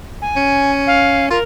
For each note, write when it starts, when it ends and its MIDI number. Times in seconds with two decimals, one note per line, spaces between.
0.22 0.71 80
0.36 1.29 61
0.87 1.29 77
1.31 1.38 65
1.31 1.43 70